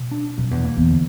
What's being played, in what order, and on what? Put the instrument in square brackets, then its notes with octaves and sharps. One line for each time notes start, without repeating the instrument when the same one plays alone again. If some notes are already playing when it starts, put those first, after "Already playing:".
Already playing: [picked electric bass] B2
D4
[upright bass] F#2 [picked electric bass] B2
[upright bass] E2
[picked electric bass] A#3
[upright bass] E2
[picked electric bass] D3